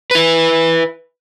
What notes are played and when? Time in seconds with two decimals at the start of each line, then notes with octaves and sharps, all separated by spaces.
0.11 E4 B4